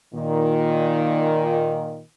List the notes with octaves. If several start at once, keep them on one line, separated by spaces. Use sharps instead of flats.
A#2 D#3